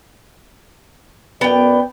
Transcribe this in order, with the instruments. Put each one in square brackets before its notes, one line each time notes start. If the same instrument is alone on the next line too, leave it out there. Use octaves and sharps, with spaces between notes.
[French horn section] F#2 D5 [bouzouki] B3 G5